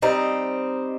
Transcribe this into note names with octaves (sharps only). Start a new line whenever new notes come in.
G3 C4 D#4